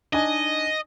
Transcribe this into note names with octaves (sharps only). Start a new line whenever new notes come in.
D4 D#4 D#5 G#5